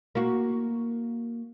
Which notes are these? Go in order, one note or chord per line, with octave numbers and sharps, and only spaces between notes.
A#3 F#4